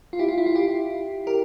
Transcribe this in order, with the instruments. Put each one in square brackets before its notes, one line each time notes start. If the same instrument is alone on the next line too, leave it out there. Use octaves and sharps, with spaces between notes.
[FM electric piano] F4
E4 G4
F4
E4
F4
E4 G4
G4 A#4